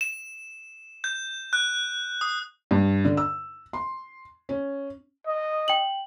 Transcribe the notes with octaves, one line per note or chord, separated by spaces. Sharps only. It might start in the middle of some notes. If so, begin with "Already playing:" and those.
E7
G6
F#6
D#6
G2
D3
E6
C6
C#4
D#5
G5 F#7